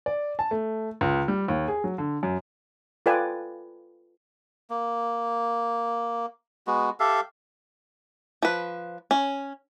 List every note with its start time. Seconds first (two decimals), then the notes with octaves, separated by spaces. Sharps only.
0.06 D5
0.39 A5
0.51 A3
1.01 C#2
1.28 G3
1.48 D#2
1.68 G#4
1.84 F#3
1.98 D3
2.23 F#2
3.06 F4 A4 B4 D5 G5 G#5
4.70 A#3
6.67 G#3 B3 F#4
7.00 G4 A4 E5 F5
8.43 F3 B4
9.11 C#4